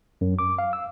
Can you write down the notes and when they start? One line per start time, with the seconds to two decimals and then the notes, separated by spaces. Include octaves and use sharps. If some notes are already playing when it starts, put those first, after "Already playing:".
0.21 F#2
0.39 D6
0.58 F5
0.73 E6